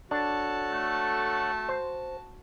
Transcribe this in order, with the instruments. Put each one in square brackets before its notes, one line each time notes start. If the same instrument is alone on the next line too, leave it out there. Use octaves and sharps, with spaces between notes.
[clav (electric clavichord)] D4 [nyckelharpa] F#4 A5 [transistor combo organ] A4 C#5 F#5
[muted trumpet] A3
[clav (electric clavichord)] C5